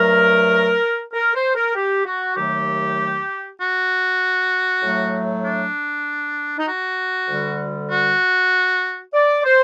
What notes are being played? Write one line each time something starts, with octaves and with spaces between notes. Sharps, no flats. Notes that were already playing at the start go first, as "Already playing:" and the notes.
Already playing: G2 F#3 A3 A#4
A#4
C5
A#4
G4
F#4
D#2 D#3 F#3 A3 G4
F#4
A2 F#3 A3
D4
D#4
F#4
D2 D3 G3
F#4
D5
C5